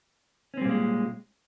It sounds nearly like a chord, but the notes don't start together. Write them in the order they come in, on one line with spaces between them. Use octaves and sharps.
C#4 C4 G3 A#2 G#3